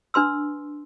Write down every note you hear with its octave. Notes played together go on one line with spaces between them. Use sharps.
D4 B4 C6 E6